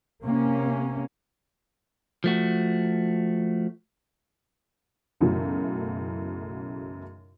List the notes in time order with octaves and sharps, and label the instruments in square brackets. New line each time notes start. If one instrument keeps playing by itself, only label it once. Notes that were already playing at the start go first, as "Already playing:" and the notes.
[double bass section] C3 A#3 C#4
[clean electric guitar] F3 A3 F#4
[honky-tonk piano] B1 F#2 C#3 E3 F#3 A3